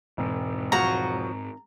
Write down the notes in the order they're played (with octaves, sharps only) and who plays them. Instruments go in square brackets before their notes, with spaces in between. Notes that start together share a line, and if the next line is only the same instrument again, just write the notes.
[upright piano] E1 [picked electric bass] G#2 C4
[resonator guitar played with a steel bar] F3 F#3 F#4 [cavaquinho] A#5